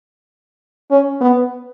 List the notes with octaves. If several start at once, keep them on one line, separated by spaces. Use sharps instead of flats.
C#4
B3